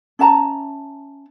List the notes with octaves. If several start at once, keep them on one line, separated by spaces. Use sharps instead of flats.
C#4 E5 A5 A#5